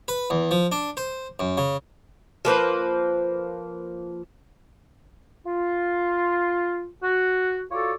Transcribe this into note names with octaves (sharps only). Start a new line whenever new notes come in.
B4
E2
F3
D4
C5
F#2
C#3
F3 A#3 B4 C5
F4
F#4
F4 F#4 A4 C#5 D5